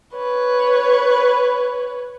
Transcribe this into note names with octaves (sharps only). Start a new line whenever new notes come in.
B4 C#5